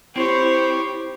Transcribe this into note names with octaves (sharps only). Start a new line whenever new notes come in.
C4 E4 G4 C5 C#5